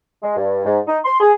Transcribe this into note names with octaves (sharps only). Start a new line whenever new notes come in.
G#3
G2
G#2
D#4
C6
G#4